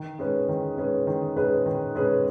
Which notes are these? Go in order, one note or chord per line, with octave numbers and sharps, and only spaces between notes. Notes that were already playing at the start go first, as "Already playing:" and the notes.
Already playing: D#3
G#3 C#4 G#4 B4
D#3
G#3 C#4 G#4 B4
D#3
G#3 C#4 G#4 B4
D#3
G#3 C#4 G#4 B4